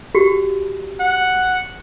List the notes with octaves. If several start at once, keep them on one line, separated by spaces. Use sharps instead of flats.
F#4 G4
F#5